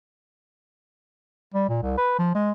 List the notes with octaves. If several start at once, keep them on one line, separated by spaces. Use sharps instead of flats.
G3
A#2
C2
B4
F3
G#3